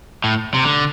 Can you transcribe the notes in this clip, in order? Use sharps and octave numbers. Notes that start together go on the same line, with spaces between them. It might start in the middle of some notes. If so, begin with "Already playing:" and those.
A2
C3
D3